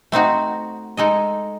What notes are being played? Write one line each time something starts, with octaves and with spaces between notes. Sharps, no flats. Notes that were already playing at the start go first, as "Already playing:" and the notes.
A3 C4 D#4 F#4
G#3 D#4 A4 D#5